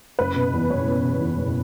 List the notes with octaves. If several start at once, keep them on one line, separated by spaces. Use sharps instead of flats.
F#1 B4
B2
E2
F#1 C#5
F#1
B2
E2
F#1